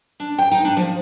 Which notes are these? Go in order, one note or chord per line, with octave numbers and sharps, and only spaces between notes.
D4
G5
D#4
D4
F3